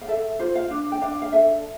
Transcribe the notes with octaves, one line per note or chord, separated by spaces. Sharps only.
F5
A4 E5
F4 C5
F5
D4
G5
D4 F5
F5
A4 E5